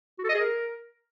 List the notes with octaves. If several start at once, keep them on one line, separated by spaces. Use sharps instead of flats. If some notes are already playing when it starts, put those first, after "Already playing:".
F#4
A4
D#5
G#4
A#4